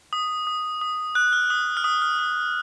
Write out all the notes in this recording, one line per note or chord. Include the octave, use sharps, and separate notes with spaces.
D#6
D#6
D#6
F#6
F6
D#6
F6
D#6
F6
D#6